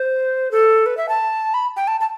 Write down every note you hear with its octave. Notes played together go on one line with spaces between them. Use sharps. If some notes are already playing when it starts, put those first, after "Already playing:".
Already playing: C5
A4
B4
E5
A5
B5
G5
A5
A5